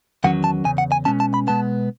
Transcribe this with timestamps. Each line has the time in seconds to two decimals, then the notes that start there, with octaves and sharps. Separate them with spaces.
0.24 E2 D#3 F#3 C#4 F#5
0.44 A5
0.65 E2 C#3 G#5
0.78 F#5
0.92 G#5
1.05 B2 G#3 C#4 A5
1.20 A5
1.34 B5
1.47 B2 G#3 B3 A5